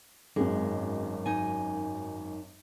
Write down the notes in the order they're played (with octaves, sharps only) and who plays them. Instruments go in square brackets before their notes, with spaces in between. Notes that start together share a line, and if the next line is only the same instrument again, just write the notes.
[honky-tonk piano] G#1 F#2 [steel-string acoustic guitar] G#3
[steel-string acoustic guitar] D#4 G#5